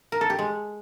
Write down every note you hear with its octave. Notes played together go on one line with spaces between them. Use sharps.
A#4
A4
G4
G#3